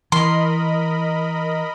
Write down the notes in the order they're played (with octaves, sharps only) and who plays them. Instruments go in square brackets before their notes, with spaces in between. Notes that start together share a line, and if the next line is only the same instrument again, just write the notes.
[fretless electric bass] E3 [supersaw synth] A#4 D#5 B5 [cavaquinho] C6